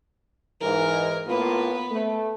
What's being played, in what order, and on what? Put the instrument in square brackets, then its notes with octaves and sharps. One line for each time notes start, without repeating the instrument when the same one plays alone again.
[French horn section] G#2 E3 [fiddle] A#4
[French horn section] A2 A#3 F4 [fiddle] B3 B4
[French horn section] A3